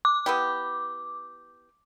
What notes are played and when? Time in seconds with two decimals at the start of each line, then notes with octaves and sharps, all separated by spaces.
0.05 D6
0.26 B3 E4 G4